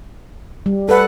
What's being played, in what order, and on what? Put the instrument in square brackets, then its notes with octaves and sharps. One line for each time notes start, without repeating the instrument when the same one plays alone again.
[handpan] G3
[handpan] A4 F#5 [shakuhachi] B4